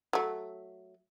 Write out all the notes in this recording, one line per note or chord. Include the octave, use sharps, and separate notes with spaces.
F#3 A3